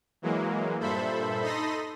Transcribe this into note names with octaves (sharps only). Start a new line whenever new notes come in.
E3 F#3 G#3 A#3
G2 A#2 A4 C5 E5 B5
D#4 A4 B5 C6 D#6 A#6